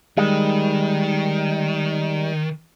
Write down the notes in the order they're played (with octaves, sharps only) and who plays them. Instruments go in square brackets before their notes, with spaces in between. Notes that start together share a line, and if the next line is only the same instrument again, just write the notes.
[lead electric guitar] D#3 [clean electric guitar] G3 G#3